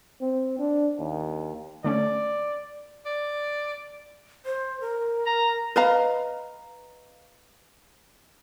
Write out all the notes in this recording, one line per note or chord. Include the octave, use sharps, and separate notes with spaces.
C4
D4
D#2
D3 A3 C#4 D5
D5
C5
A#4
A#5
B4 D#5 F5 A#5